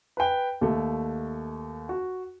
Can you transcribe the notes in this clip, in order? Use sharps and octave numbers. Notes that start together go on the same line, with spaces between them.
B4 G5
D#2 A3
F#4